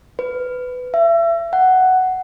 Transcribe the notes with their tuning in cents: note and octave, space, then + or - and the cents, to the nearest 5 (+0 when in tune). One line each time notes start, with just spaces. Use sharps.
B4 +20
E5 +35
F#5 +10